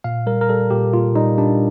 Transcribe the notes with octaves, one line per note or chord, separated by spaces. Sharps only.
A#2 F5
G3 A#4
A#4
G3 A4
A#2 G4
A#2 F4
G3 D#4
G3 D4